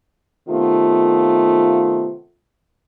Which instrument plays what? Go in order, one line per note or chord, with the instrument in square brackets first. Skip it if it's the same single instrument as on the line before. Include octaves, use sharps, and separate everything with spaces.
[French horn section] C3 D#3 A3 B3 F4